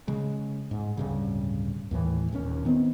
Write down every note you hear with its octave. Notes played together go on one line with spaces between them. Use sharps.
C#3 G#3
G#2
D1 G2 C#3
D#2 A2 E3
D#1 D#2 C#4
D#3 B3 C4